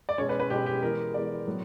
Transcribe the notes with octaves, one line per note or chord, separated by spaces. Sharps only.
D5
B2 G#3 C#4 C#5
B4
B4
B2 G#3 C#4 G4
G4
E3 G#3 B3 A#4
E3 G#3 B3 D5
A2 F#3 B3